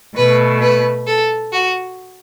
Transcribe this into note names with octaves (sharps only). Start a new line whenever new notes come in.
B2 A3 B4
B4
A4
F#4